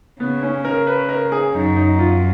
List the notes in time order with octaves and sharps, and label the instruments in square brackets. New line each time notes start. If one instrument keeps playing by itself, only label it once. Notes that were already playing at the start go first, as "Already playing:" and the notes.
[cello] C#3 [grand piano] B3
[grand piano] C#4
A#4
B4
A#4
G#4
[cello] F#2 [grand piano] D#4
[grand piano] D#4
F4